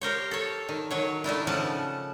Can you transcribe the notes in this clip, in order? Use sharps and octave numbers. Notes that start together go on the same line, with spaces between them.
G4 A#4 C5 C#5
A4 C#5
D#3
D#3 F#3 C#5
D#3 A3 D4 E4
C#3 F3 C#4 F#5 A5